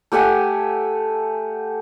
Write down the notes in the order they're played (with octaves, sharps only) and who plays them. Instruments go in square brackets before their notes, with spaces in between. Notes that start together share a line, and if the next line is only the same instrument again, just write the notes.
[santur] A3 G4 F#5 G#5